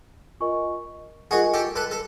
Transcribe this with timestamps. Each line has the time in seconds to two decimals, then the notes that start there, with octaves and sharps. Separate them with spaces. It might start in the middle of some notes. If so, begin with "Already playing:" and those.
0.40 F4 A#4 D#5 G#5 C#6
1.31 F4 F#4 G#4 A#4 D#5 G#5 C#6
1.54 G4 A4
1.76 A4 B4
1.91 A4